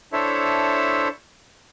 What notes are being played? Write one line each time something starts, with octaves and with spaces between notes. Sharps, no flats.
D4 E4 A4 C5 C#5 E5